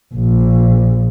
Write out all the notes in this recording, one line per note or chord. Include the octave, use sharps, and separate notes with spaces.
A#1